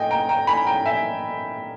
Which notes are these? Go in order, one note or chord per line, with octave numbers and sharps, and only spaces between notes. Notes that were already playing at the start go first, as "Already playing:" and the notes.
Already playing: A#2 D#5 G5 G#5
G5 A#5
G5 A#5
G#5 B5
G5 A#5
E5 G#5